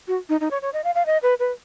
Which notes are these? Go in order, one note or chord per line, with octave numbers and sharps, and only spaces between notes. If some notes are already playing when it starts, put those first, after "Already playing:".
F#4
D#4
D#4
C#5
C#5
D#5
F5
F5
D#5
B4
B4